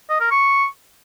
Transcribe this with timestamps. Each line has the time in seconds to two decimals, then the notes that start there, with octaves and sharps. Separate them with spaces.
0.10 D#5
0.20 A#4
0.31 C#6